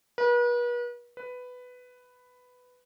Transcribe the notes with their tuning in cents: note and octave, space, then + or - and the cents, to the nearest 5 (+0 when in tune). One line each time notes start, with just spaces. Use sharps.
B4 -40
B4 +10